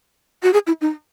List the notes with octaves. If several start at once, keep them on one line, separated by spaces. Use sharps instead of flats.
F#4
G#4
E4
D#4